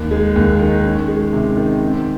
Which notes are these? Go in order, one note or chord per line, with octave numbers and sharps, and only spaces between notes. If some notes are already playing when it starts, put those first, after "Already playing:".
Already playing: D#2
G#3
D#2
D#3
C#4
G#3
C3
D#3
C4